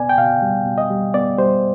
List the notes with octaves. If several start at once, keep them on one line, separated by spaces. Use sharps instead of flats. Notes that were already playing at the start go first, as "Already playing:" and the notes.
Already playing: B2 B3 D5 G#5
G5
B2 F5
G3
B2
D#5
G3
B3 D5
G3 C5